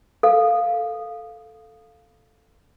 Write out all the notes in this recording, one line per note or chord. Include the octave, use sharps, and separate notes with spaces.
A4 F5